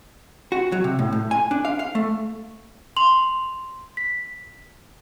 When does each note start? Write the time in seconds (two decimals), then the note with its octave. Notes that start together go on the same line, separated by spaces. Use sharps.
0.52 F#4
0.72 F#3
0.84 C3
0.99 A2
1.13 A2
1.31 G#5
1.51 D4
1.65 F5
1.79 F5
1.95 A3
2.97 C6 F7 F#7
3.97 B6